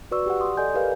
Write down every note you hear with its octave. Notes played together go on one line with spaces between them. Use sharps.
F#4 B4 D5 C#6 E6
G4 D5 F#5
C6 D#6
A4 D5 D#5 G#5 G6
G4 A#4 B4 F5 G#5